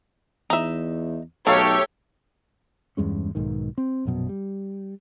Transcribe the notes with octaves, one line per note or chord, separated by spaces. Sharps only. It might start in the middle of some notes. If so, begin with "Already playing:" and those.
E2 D#4 E5
B1 D#3 A3 G4 A4 C#5 F5
E2 G2 G#3 C#4
B1 G#2 D#3
C4
A#1 F#2 B2
G3